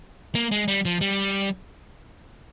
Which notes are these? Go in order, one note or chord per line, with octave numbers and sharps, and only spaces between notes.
A#3
G#3
G3
F3
G3